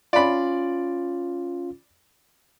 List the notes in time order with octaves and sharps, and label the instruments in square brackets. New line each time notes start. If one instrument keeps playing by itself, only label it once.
[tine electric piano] C#4 F4 [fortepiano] D5 B5